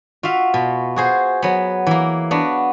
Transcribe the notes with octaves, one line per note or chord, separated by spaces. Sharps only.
F4 F#4 E5 F5
B2
F#4 G#4 C5
F#3 B3
E3 A#3
B3 D4 F#4